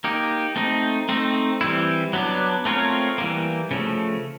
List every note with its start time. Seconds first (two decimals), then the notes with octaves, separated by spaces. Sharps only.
0.04 A#3 D#4 G4
0.56 A3 C4 D#4
1.09 A3 C4 D#4
1.61 E3 G3 C4 E4
2.13 F#3 B3 D4
2.65 A3 C4 F4 A#4 C#5
3.18 E3 G3 A#3
3.71 C#3 F3 A3